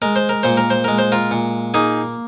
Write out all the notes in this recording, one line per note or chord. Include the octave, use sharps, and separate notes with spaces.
G#3 A#4
C5
A#4
A#2 C5
A#4
C5
G#3 A#4
C5
F4 A#4
A#2
A#3 D#4 G#4